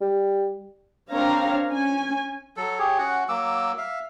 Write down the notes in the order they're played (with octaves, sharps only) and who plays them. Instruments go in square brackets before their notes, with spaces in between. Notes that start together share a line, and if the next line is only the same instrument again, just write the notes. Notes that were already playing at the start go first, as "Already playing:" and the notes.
[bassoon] G3
[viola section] C4 D4 A#4 C#5 F5 A#5
C#4 G#5
[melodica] F#3 A4
G4 G#4 C#5
C#4 F#4 F#5
F#3 A#3 D6 E6
E5 F5